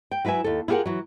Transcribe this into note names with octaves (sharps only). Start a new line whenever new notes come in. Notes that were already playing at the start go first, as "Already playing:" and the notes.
G5
F#3 E4 B4 E5 G#5
D#2 A4
E4 F4 G4 G#4 A#4 F#5
E3 F#3